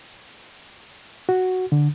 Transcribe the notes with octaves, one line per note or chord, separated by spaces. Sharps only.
F#4
D3